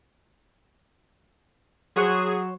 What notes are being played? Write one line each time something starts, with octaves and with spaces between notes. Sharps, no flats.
F#3 G#4 C5 C#5 F#5